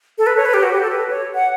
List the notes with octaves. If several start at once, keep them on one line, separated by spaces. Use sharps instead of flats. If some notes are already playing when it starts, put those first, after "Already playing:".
A4
B4
C#5
B4
G4
F#4
G4
A4
B4
C#5
F#5